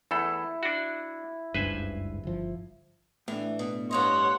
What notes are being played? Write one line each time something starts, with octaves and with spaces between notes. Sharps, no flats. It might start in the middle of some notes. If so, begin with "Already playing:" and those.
E2 A3 E4 A4
D4 F#4
F#1 C#2 G2 B4 C5 G#5
G1 F3
A2 E3 D4
B2
G2 A#3 C#5 D#5 F#5 C6